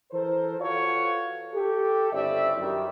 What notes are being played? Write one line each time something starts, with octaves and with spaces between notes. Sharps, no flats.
E3 A4 A#4 C5
F4 F#4 A4 B4 C#5 F5
G4 A4
G1 C#3 C4 E4 D5 E5
F#2 D#3 G3 G4